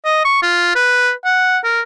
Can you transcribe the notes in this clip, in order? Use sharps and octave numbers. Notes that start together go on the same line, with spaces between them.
D#5
C#6
F4
B4
F#5
A#4